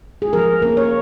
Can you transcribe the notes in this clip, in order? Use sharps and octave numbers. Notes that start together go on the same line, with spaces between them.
G#4
F3 A#4
A#3 C#4 A#4
C#5